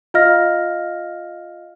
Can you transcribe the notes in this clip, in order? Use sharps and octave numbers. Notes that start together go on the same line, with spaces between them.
F4 D#5 F5 F6 A#6